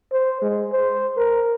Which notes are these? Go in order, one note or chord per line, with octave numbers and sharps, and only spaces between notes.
C5
G#3
C5
A#4